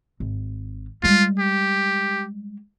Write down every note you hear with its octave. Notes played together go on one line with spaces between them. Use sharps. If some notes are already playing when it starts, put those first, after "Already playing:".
G#1
G3 G#3 F4
G4